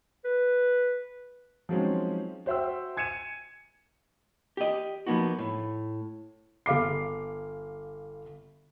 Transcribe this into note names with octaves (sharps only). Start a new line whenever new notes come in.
B4
F3 F#3 G#3 C4 C#4 D#4
F#4 C5 E5 G5 E6
G#5 G#6 C#7 D#7 E7
G4 D#5
F3 A#3 B3 D#4 F#4
A2
G1 F5 D6 C7